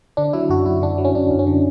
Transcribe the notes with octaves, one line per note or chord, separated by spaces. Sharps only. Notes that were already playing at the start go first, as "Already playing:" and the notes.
D3 D4
F#3 E4
F#2 F#4
F#2 E4
D3 D4
F#3
C#4
F#2 D4
F#2
C#4
D3